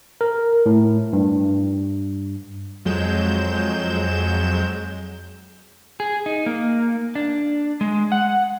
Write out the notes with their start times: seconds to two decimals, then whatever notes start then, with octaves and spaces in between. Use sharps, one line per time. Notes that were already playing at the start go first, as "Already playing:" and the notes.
0.21 A#4
0.66 A2
1.13 G2
2.85 F2 F#3 G#3 G6 E7
6.00 G#4
6.26 D#4
6.46 A#3
7.15 D4
7.81 G#3
8.12 F#5